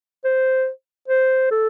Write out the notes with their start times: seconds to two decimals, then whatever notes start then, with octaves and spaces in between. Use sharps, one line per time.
0.24 C5
1.08 C5
1.51 A4